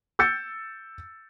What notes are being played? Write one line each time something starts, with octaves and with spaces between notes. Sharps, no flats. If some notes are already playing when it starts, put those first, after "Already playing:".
E6 G6 A6 C#7